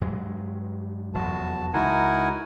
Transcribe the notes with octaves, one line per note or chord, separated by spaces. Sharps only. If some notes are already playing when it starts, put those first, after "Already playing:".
G2 F#3 G#3
F1 E2 F#3 F#4 A5
C#2 D#4 E4 F#4 A#4 F#5 G#5